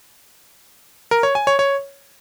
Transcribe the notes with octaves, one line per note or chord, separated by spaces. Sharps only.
A#4
C#5
G#5
C#5
C#5